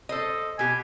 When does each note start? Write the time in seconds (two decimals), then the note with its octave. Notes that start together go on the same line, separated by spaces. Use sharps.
0.09 A4 C5 D#5
0.59 B2 G4 G#5